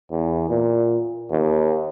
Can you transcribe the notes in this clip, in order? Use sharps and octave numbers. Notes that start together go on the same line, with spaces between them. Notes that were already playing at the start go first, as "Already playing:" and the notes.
E2
A#2
D#2